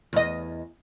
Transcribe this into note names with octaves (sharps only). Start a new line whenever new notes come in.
E2 D#5